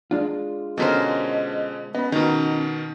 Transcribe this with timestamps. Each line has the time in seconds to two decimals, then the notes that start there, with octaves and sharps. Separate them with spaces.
0.11 G#3 D4 F4
0.78 B2 D3 C#4 A4 A#4 C5 D#5
1.95 B3 C#4 D#5 B5
2.12 B2 D#3 D#4